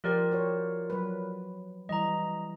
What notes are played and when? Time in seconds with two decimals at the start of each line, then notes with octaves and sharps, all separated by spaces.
0.04 F3 F4 G4 A#4 C5 D5
0.31 F#4 C5 C#5
0.90 F#3 B4
1.89 E3 G3 D#5 A#5